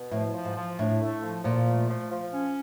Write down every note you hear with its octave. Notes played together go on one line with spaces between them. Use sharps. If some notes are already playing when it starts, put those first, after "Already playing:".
Already playing: B2
A2 F3
F3
G#2
F3
A2 D4
A3
F3
A#2 F3
A3
F3
F3
C#4